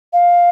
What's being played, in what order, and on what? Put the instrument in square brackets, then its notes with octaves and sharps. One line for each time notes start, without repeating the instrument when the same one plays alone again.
[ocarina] F5